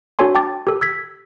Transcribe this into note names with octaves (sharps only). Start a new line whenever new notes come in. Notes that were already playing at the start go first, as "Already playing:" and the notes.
D4 F#4 A4 C#5 G#5 C6
G5 A5 D6 A6
G4 A4
E6 G#6 B6